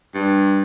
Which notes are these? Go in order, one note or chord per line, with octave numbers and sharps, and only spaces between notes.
G2